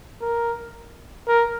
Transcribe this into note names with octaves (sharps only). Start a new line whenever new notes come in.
A#4
A#4